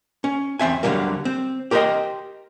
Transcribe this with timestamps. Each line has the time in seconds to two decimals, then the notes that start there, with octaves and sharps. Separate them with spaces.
0.24 C#4
0.59 E2 C4 E5 G#5
0.83 D2 D3 E3 F#3 G3 A#3
1.25 C4
1.71 G4 A#4 C5 C#5 D#5 G5